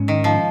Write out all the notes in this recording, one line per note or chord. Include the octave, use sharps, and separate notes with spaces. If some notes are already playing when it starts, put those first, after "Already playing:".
Already playing: G#2 G#3 C#4
D#3
F3